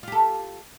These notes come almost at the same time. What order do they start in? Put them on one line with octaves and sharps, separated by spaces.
F4 G4 A4